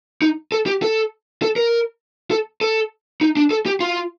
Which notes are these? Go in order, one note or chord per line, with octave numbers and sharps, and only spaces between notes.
D#4
A4
G4
A4
A4
A#4
A4
A4
D#4
D4
A4
G4
F4